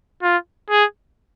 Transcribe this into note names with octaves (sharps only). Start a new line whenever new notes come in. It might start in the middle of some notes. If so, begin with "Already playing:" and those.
F4
G#4